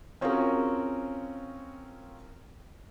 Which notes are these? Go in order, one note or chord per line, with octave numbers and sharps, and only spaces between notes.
C4 C#4 F4 F#4 G#4 A#4